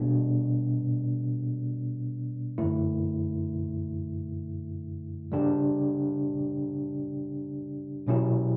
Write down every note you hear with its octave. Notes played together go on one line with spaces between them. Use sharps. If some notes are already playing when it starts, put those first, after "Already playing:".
Already playing: B2 G3 B3 D4
F#2 D3 A3 E4
C#3 G3 D4 G4
B2 F#3 C#4 E4 G4